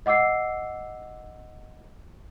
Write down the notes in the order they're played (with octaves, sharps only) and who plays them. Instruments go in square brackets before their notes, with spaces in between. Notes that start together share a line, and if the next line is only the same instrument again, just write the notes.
[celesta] D#5 F#5 D6 E6 C7